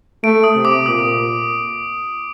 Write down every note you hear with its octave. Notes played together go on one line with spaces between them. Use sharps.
A3 D7
D#6
C3
D6
A#2 D#6